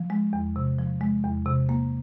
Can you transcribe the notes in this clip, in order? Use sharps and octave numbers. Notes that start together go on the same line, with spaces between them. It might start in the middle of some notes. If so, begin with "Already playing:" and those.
Already playing: F3
G#3
E2
C3
F3
G#3
E2
C3
A#3